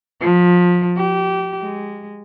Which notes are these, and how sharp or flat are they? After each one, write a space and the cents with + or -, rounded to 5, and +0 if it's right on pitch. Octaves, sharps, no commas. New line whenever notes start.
F3 +25
G4 -25
G#3 -15